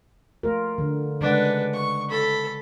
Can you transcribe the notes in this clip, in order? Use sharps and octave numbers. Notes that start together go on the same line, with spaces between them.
A3 F4 A#4
D3
C#3 G#3 D4 B4 F#5
C#6
A4 B5